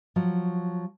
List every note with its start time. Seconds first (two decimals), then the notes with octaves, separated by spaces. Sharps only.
0.16 F3 F#3